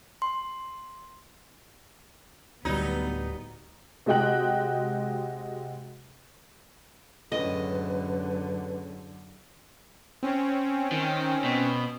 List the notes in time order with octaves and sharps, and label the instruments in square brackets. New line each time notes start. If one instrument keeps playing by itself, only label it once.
[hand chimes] C6
[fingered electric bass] D1 D2 [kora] F#3 G3 [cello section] B3 [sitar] D#4
[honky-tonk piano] C3 G#3 F#4 D#5 G5 F#6
[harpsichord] C#2 A2 [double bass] F#2 D3 [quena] B4 [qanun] D#5
[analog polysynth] C4 C#4
[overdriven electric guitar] D#3
B2